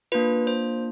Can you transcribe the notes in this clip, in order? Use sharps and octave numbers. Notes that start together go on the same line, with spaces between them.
A#3 D4 F4 B4
C5